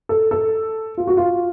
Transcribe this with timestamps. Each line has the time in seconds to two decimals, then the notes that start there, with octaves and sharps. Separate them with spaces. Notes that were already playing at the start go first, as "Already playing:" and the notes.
0.09 A4
0.31 A4
0.97 F4
1.07 F#4
1.17 F4